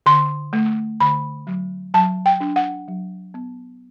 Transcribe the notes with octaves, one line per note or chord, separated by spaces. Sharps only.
D3 C6
A3
D3 B5
F#3
F#3 A5
G5
D4
F#5
F#3
B3